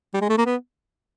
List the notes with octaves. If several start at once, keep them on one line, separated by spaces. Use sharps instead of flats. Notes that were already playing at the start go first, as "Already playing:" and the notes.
G3
G#3
A3
A#3
B3